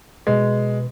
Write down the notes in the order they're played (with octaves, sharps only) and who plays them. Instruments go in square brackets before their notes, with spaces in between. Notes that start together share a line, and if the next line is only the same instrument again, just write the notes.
[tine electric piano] B2 B4 [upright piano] G#3